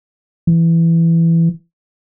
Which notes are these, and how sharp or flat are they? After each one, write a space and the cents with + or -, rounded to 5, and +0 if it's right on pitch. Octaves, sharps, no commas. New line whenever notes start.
E3 +10